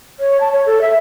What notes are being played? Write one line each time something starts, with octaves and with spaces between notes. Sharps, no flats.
C#5
A5
C#5
A4
E5